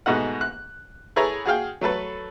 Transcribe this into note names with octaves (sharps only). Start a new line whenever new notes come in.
G#2 B2 A3 D#4 F#5
F#6
E4 G#4 A4 B4 C#5 A#5
F#4 G#4 F5 G5
F#3 A3 A4 B4